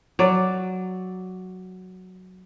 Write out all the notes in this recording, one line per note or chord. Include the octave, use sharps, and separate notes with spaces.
F#3 D5